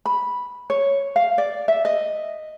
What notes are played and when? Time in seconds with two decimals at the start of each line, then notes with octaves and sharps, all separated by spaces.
0.06 B5
0.70 C#5
1.16 F5
1.38 D5
1.68 E5
1.85 D#5